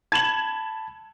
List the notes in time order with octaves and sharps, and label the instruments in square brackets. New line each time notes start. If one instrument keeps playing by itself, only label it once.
[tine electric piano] A5 B5 [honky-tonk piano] G#6 E7 F#7